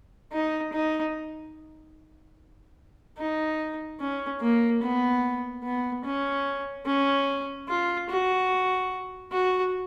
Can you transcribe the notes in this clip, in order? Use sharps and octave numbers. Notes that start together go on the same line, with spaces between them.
D#4
D#4
D#4
C#4
A#3
B3
B3
C#4
C#4
F4
F#4
F#4